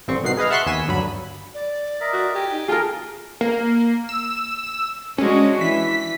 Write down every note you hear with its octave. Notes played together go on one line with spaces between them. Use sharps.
A1 G2 D3 C4 C#6
C2 B2 D#3 F#5 C7
G#4 B4 D#5 F5
E5 F#5 A5 C6 C#6 F#6
D#2 B3 G#5 E6 B6
D2 G2 F#3 G3 B5
D5
A#4 D#5 E5
F#4
G4 G5 G#5
D#4
F4 G#4 A#4 A5
A#3
E6
G#3 C#4 D4 F#4
E3 B6